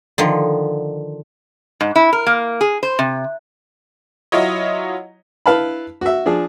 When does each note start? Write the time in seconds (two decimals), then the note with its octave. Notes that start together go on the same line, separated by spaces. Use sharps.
0.18 D3 D#3 F3
1.81 G#2
1.96 E4
2.13 A#4
2.27 A#3
2.61 G#4
2.83 C5
2.99 C3
4.32 F#3 E4 F4 C#5 D#5
5.46 E4 B4 F5 A5 B5
6.01 F#4 E5
6.26 F3 D4 G#4